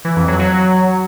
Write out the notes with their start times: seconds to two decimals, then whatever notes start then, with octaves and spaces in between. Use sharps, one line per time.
0.05 E3
0.16 F2
0.28 F#3
0.39 F#3